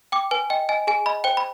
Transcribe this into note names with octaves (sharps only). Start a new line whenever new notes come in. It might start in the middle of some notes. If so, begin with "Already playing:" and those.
G5 D6
B4 G#5
D#5 G5
D#5 G#5
G#4 G#5
D#5 B5
C5 G5
B5